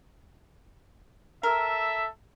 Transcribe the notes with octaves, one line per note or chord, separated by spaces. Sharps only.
A4 A#4 E5